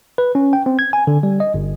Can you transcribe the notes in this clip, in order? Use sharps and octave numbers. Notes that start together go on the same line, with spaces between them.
B4
C#4
G5
C4
G#6
G#5
D3
G3
D#5
G1